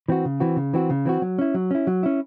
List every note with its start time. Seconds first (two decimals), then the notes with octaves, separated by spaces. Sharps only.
0.08 E3 C4 F#4
0.25 C#3
0.40 E3 C4 F#4
0.57 C#3
0.74 E3 C4 F#4
0.90 C#3
1.05 E3 C4 F#4
1.22 F#3
1.39 C#4 E4
1.54 F#3
1.71 C#4 E4
1.87 F#3
2.03 C#4 E4